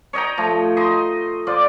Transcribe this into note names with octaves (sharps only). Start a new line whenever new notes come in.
C#5 D#5 G5 A#5
F3 A3
D#4 D#5 C6
F4 C5 D5 D6